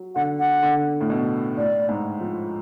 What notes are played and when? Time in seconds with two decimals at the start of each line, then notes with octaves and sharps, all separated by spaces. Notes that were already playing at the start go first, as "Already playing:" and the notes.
Already playing: F#3
0.15 D3 F#5
0.39 F#5
0.63 D3
1.01 A2
1.10 B2
1.57 A2 D5
1.89 G#2
2.21 F3